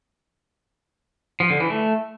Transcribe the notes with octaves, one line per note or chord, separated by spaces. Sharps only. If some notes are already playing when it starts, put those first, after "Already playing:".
F3
D3
E3
A3